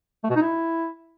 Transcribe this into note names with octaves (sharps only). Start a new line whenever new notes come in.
A3
B2
D#4
E4